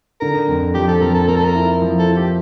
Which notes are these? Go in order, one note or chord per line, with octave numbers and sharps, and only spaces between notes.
D3 A#4
F2
F3 G4
A4
F2 A#4
A4
A#3 A#4
A4
A#4
E4
F3
A4
E4
G4